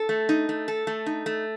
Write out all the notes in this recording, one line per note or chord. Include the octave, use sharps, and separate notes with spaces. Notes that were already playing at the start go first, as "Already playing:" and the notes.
Already playing: A4
A3
D#4
A3
A4
A3
D#4
A3